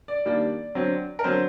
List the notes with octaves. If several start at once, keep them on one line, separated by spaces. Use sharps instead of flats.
D5
D#3 G3 A#3 D4
D3 F#3 C4
A#4
D3 F#3 C4 C5